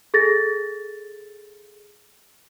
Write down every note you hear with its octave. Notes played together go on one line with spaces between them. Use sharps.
G#4 A4 A6 A#6